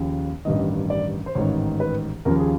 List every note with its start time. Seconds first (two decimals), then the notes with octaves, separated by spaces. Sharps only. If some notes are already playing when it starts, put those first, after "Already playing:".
Already playing: D#2 C#3 F3
0.45 A1 G2 D#3 D#5
0.90 D5
1.26 C5
1.35 A1 G#2 D#3 C#5
1.80 B4
2.25 D#2 C#3 F3 A#4
2.39 G#4